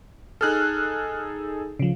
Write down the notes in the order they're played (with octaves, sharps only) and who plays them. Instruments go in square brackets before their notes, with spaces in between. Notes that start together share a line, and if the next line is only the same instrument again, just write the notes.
[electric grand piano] D#4 G#4 A4 [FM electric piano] F6 F#6
[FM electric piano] C#3 F3